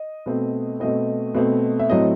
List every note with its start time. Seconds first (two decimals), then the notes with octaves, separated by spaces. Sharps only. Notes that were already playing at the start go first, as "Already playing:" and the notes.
Already playing: D#5
0.26 B2 A3 C4
0.80 B2 A3 C4 D#5
1.35 B2 A3 C4
1.79 E5
1.90 A2 F#3 A3 C4 D#5